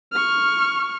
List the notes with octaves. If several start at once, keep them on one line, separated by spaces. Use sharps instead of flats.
C#6 F6